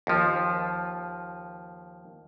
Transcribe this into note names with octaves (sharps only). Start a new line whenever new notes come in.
D#2 F3